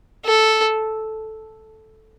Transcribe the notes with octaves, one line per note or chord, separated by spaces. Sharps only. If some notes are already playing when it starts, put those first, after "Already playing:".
A4